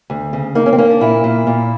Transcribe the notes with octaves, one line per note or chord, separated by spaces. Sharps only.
D2
C#3
A#3 D#4
C#4
C4
A#3 C#4
D4
A#2 E4
A#2
A#2